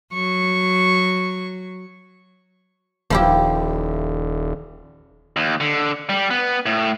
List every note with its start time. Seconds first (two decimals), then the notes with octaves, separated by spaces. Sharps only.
0.13 F#3 C#6
3.10 D#1 F3 E4 G4
5.36 D#2
5.61 D3
6.10 G3
6.30 B3
6.66 A2